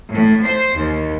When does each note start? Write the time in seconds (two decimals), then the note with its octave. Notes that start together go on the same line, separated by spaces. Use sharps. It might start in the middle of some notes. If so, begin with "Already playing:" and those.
0.11 A2
0.43 C5
0.74 D#2